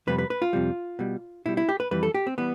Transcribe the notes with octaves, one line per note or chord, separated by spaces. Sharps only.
F2 C3 G3 B4
B4
B4
F4
F2 C3 G3
B2 G3
B2 G3 E4
E4
G4
B4
F2 E3 G3 B4
A4
G4
C4
E3 G3 B3